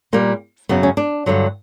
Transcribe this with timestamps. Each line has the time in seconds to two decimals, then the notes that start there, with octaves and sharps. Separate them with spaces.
0.13 A#2 G3 A#3
0.69 F#2 C#3 F#3 B3
0.83 C#4
0.97 D4
1.26 G2 D3 F#3